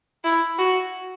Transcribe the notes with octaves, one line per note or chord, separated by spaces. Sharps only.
E4
F#4